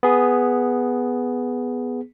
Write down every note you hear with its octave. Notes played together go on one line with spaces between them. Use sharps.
B3 G#4